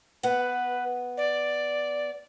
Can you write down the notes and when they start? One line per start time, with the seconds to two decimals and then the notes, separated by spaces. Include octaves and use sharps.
0.23 B3 B4 F#5
1.17 D5